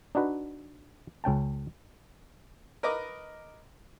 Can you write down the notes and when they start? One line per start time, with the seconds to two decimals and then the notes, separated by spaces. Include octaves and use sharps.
0.15 D4 D#4 F#4 B4
1.24 C#2 C#4 G5 A5
2.83 A#4 B4 D#5 D6